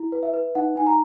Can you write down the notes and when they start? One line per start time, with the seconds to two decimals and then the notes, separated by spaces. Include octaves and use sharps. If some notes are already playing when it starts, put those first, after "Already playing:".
Already playing: E4
0.12 B4
0.23 E5
0.34 B4
0.55 D#4 F#5
0.76 D#4 G#5
0.87 A#5